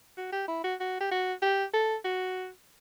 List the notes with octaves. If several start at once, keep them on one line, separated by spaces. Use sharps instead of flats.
F#4
G4
E4
F#4
F#4
G4
F#4
G4
A4
F#4